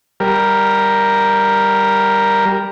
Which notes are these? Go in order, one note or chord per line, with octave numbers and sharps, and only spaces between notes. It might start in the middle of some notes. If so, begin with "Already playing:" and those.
G3 A#4